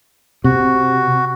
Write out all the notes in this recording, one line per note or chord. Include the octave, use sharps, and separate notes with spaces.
C3 F#4